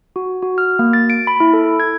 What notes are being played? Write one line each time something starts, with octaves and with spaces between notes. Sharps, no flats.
F#4
F#4
F6
A#3
A6
D7
B5
E4
A4
G#6